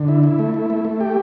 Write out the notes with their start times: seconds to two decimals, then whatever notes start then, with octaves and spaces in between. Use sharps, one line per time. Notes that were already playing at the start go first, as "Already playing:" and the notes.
Already playing: D3
0.08 E4
0.23 E4
0.39 A3
0.54 E4
0.70 A3
0.85 A3
1.00 G4